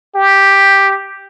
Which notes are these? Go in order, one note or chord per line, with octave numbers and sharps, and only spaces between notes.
G4